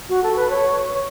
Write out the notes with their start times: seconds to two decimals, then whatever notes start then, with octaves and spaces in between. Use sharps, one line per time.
0.09 F#4
0.23 A4
0.36 B4
0.50 C#5